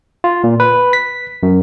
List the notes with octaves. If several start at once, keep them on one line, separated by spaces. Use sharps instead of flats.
F4
A#2
B4
B6
F#2